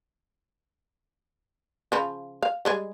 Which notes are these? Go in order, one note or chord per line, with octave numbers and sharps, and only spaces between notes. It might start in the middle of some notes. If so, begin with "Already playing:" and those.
C#3 F3 B5
F5
G3 G#3 G#4